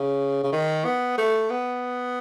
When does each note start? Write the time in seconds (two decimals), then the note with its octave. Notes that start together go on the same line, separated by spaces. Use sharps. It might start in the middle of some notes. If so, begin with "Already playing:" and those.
Already playing: C#3
0.44 C#3
0.53 D#3
0.85 B3
1.18 A3
1.50 B3